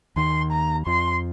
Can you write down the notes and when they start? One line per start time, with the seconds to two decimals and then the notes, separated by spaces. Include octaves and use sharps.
0.16 D#2 D#3 C6
0.52 A#5
0.87 F2 F3 C6